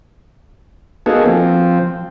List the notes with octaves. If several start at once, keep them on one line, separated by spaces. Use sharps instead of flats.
A#3 B3 D#4 F#4 G#4 A4
F3 C4